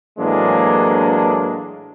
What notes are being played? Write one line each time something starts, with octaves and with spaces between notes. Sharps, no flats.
A2 E3 F#3 G#3 A#3 D4